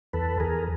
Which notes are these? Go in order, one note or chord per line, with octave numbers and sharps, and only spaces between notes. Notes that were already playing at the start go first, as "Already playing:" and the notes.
E2 A4 B4
E2 G#4 A#4